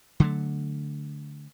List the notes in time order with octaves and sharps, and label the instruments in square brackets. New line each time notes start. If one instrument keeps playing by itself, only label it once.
[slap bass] D3 F#3 A3